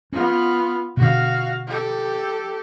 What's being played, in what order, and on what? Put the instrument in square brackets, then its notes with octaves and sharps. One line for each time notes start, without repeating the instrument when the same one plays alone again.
[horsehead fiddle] B3 F4 [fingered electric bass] C#4
[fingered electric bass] B2 D3 [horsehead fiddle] F#4 F5
[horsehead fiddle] G4 A4